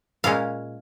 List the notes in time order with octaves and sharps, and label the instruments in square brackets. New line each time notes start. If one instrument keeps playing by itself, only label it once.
[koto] A#2 G#3 C#4 F5